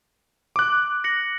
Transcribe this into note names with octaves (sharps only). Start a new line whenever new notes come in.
D6 F#6
A#6 C#7 F#7